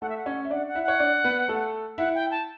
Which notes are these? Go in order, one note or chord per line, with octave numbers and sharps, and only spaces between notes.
A3 A4 F#5
E5
F#5
C#4 C#5
E5
D4 D5 F#5
F#5
E4 E5
C#5 F#5
D4 D5
B3 B4
A3 A4
E4 E5 F#5
G5
A5